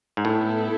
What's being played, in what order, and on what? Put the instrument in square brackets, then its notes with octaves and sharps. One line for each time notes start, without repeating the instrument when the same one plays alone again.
[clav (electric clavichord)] G#2
[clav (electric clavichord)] A2 [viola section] B3 E4 A4